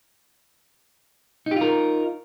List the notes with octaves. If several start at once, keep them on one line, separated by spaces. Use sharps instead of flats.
D#4 F4 G4 A#4